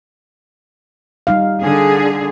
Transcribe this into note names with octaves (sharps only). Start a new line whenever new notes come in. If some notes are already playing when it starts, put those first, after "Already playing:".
G3 D#4 F5
D3 G#4